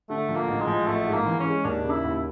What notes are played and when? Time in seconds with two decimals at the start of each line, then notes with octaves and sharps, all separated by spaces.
0.10 D3 A3
0.29 F3
0.35 A#3
0.48 A1
0.61 G#3
0.67 F3
0.87 A1 A3
1.06 G#2
1.13 A#3
1.26 E3
1.40 C#4
1.46 G#3
1.64 D#2 D4
1.84 C#3
1.91 E4
2.04 D#2